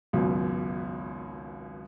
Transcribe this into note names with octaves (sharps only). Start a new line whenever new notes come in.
G#1 C#2 F#2 B2